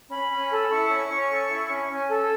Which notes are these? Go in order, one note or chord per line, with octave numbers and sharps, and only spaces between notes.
C#4 B5
C#4
A4
E4 C#6
C#4
C#4
A4
E4
C#4
C#4
A4